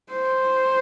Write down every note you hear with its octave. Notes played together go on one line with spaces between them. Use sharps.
C5